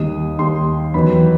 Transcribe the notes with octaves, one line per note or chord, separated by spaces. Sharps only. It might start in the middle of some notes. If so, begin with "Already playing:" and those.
Already playing: D#2 D#3 G3 D#6
D#2 D#3 G3 C6
E2 D#3 F#3 B3 B5